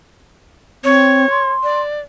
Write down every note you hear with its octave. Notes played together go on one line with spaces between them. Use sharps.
C4 C#5
C6
D5